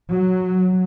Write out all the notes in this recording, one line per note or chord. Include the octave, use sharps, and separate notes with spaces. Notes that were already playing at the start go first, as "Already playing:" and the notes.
F#3